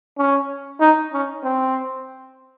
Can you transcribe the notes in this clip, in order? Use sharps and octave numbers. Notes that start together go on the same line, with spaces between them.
C#4
D#4
C#4
C4